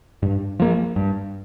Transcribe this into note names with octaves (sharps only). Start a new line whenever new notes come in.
G2
F3 A#3
G2